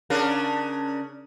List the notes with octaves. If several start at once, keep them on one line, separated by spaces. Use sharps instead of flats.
C#3 D4 A#4